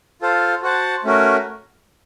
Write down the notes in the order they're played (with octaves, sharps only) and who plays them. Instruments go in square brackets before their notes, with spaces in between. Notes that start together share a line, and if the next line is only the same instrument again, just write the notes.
[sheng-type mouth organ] F4 A4 C5 F5
F#4 C5 F#5 A5
A3 C#4 F#4 A#4